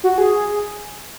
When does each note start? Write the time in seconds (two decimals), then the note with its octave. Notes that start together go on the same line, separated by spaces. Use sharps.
0.04 F#4
0.18 G#4